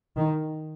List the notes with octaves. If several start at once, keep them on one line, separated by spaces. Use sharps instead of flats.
D#3